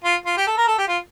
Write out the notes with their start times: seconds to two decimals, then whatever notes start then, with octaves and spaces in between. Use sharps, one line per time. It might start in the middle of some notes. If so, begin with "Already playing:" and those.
0.04 F4
0.26 F4
0.37 G4
0.47 A4
0.57 A#4
0.67 A4
0.78 G4
0.88 F4